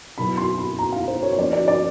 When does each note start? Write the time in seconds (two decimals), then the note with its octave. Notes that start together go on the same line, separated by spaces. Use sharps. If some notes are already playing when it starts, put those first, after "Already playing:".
0.18 B2 F#3 B3 E4 B5
0.37 C6
0.58 B5
0.79 A#5
0.92 F5
1.08 C5
1.23 C#5
1.33 C#5
1.38 F3 A#3 C#4 E4 D5
1.53 D5
1.68 D5